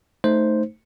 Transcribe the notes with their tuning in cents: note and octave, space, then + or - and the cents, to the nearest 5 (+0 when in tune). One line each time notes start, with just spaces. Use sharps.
A3 +0 D#4 +0 C5 +0